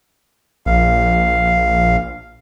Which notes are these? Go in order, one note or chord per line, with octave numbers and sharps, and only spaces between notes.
A#1 F5